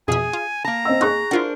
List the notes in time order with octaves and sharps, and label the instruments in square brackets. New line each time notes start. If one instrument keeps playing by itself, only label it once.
[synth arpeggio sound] F2 B2 E5 [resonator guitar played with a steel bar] G#4 [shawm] G#5
[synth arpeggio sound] F4
[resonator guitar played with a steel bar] A#3 A5 [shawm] A#5
[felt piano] C4 D#5 E6
[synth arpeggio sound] D#4 [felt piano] G#4 C#6 F#6
[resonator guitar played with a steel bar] D4 A#4 C5 [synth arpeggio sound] E4 F4 F#5